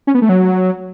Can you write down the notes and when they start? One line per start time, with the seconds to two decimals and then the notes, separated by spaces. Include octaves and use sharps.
0.07 C#4
0.15 B3
0.22 A3
0.29 F#3